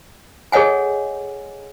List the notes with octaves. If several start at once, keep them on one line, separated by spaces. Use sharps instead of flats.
G#4 A4 C#5 D#5 F#5 G#5